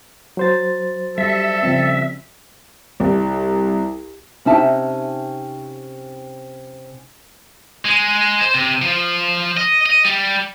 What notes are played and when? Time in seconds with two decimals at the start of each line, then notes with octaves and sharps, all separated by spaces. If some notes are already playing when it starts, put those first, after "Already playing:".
0.37 F#3 C5 A6
1.18 G3 A4 E5
1.63 C#3 F3 C4
3.00 C2
4.45 C3 C#4 D#4 E5 A5
7.85 G#3
8.41 C5
8.54 C3
8.82 F3
9.57 D#5
9.86 D#5
10.05 G3